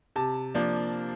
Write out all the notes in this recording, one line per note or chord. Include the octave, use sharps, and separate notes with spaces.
C3 A5
F3 A#3 D4